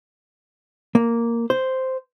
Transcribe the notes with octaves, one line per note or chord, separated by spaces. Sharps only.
A#3
C5